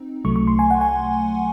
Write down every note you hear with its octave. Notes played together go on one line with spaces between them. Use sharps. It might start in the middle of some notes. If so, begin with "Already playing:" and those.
Already playing: C4 D#4
C2 C3 F#3 A3 C#6
C#6
C6
G#5
F#5
G#5